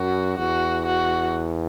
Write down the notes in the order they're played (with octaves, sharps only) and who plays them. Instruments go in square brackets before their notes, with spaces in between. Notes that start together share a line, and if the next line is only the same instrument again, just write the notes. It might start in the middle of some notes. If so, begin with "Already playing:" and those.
Already playing: [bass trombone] F#2 [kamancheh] F#4
[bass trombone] E2 [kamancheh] F#4
[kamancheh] F#4